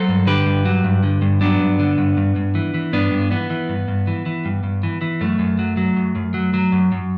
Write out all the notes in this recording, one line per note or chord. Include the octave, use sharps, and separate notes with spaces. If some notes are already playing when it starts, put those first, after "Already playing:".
Already playing: F#3 A4 C5
G2
D3 G4 B4
G2
F#3
G2
D3
G2
F#3 B3 D4
G2
D3
G2
G2
G2
E3
E3
G2 B3 D4
G2
E3 B3
E3
G2
G2
E3
E3
G2
G2
E3
E3
F#2 A3
F#2
F#3
F#3
F#2
F#2
F#3
F#3
F#2
F#2